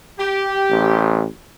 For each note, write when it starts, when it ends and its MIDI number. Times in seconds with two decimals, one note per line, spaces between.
0.18 1.04 67
0.70 1.26 33